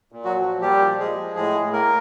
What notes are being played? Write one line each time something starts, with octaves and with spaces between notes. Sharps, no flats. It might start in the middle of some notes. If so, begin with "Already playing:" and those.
A#2
F#3 F#4
F3
A#2 G3 G4
F3
G#3 G#4
F3
A2 G#3 G#4
A2
A#3 A#4